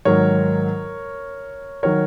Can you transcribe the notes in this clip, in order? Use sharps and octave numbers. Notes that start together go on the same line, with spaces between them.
G#2 D#3 F#3 A#4 C#5
D#3 F#3 A#4 C#5